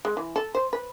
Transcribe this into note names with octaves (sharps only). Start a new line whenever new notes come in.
G#3
E3
A4
C5
B4